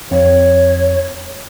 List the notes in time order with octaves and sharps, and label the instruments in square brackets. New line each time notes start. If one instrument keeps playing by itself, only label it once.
[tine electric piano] F2 [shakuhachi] C#5